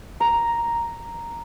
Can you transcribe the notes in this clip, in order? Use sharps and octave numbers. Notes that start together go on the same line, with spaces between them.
A#5